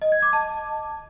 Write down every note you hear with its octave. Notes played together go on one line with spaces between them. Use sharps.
D#5
G#6
D6
A5